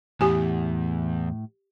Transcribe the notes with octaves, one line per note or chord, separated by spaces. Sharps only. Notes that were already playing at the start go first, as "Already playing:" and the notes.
E2 A2 G4 G#5